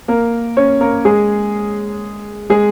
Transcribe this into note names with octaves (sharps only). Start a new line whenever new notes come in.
A#3 A#4
C#4 C#5
A#3 A#4
G#3 G#4
G#3 G#4